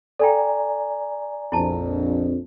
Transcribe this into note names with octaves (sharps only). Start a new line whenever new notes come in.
A4 D5 G5 G#5 A#5
A#1 F2 E4 A5